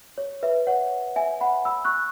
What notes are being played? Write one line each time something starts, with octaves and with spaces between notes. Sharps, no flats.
C#5
B4 E5
C#5 F#5
E5 G#5
F#5 B5
B5 E6
C#6 F#6